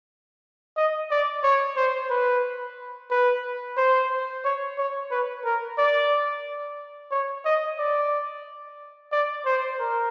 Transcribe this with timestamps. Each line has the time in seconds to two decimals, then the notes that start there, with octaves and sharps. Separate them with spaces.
0.77 D#5
1.11 D5
1.43 C#5
1.76 C5
2.10 B4
3.10 B4
3.77 C5
4.44 C#5
4.78 C#5
5.11 B4
5.45 A#4
5.78 D5
7.11 C#5
7.45 D#5
7.78 D5
9.12 D5
9.45 C5
9.79 A#4